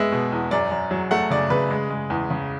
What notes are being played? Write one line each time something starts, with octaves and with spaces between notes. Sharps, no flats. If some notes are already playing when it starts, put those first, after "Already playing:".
Already playing: G#3 B3 E5
B2
E2
F#2 D5
F#2
F#3
A3 F#5
C#3 D5
C#3 B4
G#3
G#3
E2
C#3